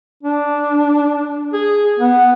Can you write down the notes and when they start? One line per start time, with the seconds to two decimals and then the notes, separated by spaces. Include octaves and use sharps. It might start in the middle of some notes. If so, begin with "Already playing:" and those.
0.23 D4
1.53 G#4
1.99 B3